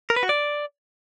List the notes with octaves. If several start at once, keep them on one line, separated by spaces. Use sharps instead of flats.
A#4
B4
F#4
D5